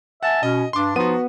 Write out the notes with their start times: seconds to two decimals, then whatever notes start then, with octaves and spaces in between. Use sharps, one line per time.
0.23 E5 F#5 G#5 A5
0.43 B2 C#4 D#5
0.73 G2 D4 C6 D6
0.96 F3 B3 D#4 F4 F#4 D#7